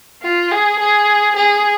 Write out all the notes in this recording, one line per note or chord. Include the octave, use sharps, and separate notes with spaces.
F4
G#4
G#4
G#4